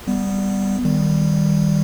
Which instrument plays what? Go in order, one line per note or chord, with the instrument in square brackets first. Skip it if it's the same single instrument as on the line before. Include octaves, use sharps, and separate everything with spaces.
[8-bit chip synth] G3 B3
D#3 G3